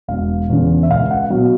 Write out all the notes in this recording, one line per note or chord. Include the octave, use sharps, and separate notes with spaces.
E1 F5
E2 C#3
E5
C#2 F5
F#5
B2 F#3 F5